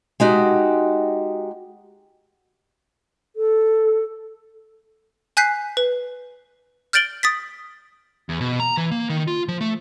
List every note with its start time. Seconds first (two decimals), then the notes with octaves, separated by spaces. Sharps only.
0.20 G#3 D#4 F#4 G4
3.36 A4
5.37 G#5 F#6 G6 B6 C7
5.77 B4
6.93 F6 G6 A6 D7 F#7 G7
7.23 D#6 A6 B6
8.29 E2
8.41 B2
8.60 A#5
8.77 E3
8.91 A#3
9.09 D#3
9.28 F4
9.48 F3
9.61 A3